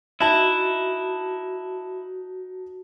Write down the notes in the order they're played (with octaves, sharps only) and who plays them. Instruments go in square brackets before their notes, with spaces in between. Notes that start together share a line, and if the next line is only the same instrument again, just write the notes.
[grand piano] D#4 A5 [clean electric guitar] E4 [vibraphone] F#4